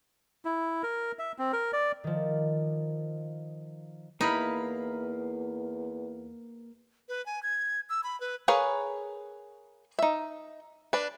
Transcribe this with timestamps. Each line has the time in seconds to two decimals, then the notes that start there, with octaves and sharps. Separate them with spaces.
0.45 E4
0.83 A#4
1.19 E5
1.38 C4
1.53 A#4
1.73 D5
2.04 D#3 F3
4.21 E2 A#3 D#4 E4 F5 B5
7.09 B4
7.26 G#5
7.43 G#6
7.90 E6
8.04 B5
8.20 B4
8.48 G#4 A#4 B4 C#5 F5
9.99 D#4 E5
10.93 D4 B4